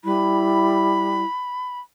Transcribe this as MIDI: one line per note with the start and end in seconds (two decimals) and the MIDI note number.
0.05 1.23 55
0.05 1.25 64
0.05 1.80 83